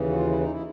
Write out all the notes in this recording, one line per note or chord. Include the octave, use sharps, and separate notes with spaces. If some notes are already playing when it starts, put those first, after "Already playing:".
Already playing: D#2 C#3 E3
F#4
F4
E4
D#4
E4